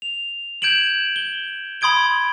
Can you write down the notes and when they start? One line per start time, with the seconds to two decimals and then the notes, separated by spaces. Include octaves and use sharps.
0.02 F7
0.62 G6 G#6 D7 E7 F#7
1.16 G7
1.81 B5 C6 D#6 G#6 D7 G7